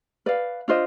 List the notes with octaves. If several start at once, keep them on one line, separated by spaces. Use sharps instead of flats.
B4 D5 F5
D4 F4 C5 D#5